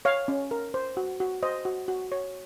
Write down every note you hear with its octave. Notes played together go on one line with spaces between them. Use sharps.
C#5 F5
C#4
A#4
C5
F#4
F#4
C5 D#5
F#4
F#4
C#5